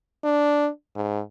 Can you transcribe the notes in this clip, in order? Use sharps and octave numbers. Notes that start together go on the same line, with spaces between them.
D4
G#2